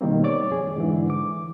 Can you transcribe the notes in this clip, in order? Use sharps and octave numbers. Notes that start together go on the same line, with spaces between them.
B2 D#3 G3 A#3 C4
C#5 D5 D6
F2 G#4
G#2 D3 E3
D6